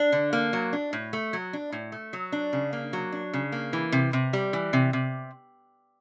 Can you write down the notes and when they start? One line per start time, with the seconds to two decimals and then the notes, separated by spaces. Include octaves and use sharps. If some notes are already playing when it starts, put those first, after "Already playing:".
Already playing: D4
0.12 D3
0.33 A#3
0.53 F#3
0.73 D4
0.93 A2
1.13 A3
1.33 F#3
1.53 D4
1.72 A2
1.92 A3
2.13 F#3
2.32 D4
2.53 C#3
2.73 A#3
2.93 F#3
3.12 D4
3.34 C#3
3.52 A#3
3.73 E3
3.92 C3
4.13 C3
4.33 G3
4.53 E3
4.73 C3
4.93 C3